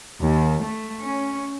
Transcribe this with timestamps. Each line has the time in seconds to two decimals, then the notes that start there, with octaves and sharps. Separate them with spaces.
0.21 D#2
0.63 A3
1.02 C#4